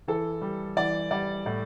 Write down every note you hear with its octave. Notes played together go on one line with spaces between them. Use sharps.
E3 A4
G3
E3 D5
G3 D5
A2 D5